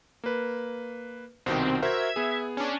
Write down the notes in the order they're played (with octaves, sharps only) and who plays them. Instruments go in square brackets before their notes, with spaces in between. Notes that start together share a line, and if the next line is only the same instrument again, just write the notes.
[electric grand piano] A#3 B4
[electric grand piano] C2 B2 D#3 [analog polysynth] C4
[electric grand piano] F#4 A#4 C5 [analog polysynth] E5 G#6
[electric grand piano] B3 G#4
[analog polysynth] C#4 D4